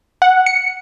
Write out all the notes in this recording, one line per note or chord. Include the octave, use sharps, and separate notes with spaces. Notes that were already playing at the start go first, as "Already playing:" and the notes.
F#5
C#7